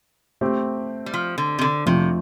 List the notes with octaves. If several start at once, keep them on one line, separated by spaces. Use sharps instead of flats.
A3 C4 G4
G3
F3
D3
C3
D3
F2 C3 F3 A3